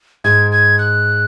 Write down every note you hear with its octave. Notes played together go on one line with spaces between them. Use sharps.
G#2 G#6
G#6
F#6